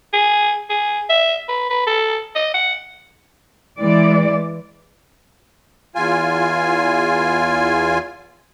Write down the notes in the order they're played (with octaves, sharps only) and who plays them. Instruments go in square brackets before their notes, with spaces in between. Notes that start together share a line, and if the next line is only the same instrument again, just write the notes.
[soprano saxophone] G#4
G#4
E5
B4
B4
A4
D#5
F#5
[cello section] E3 G#3 D5
[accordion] E2 F4 G#5